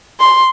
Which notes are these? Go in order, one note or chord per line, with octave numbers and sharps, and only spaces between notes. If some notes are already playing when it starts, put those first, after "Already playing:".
C6